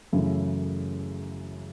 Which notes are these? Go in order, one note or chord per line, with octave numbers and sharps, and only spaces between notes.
F#2 C#3 E3 A3 E4